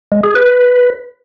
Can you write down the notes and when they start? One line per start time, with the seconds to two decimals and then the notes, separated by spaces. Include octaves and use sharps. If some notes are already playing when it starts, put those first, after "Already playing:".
0.12 G#3
0.23 G#4
0.35 B4